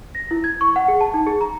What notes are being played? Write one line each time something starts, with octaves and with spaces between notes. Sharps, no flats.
A#6
E4
G#6
C#6
F#5
G#4
A5
D#4
G#4
A#5